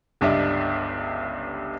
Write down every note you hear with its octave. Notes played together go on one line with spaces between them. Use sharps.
G1 C#2 G2 D4 D#5 E5